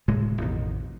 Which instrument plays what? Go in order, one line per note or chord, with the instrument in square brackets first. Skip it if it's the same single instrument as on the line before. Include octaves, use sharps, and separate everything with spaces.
[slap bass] D1 A2 C3 G#3
A1 F2 B2 D#3